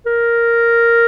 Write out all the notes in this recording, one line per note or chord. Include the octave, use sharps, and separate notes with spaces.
A#4